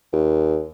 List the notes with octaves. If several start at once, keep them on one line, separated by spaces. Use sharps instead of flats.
D#2